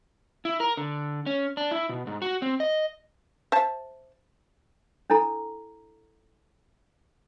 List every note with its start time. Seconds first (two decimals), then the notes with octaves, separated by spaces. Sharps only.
0.45 E4
0.60 A#4
0.77 D3
1.26 C#4
1.57 D4
1.71 E4
1.89 B2
2.07 G#2
2.22 F#4
2.42 C4
2.60 D#5
3.52 C5 E5 A5
5.10 D4 E4 A4 A#5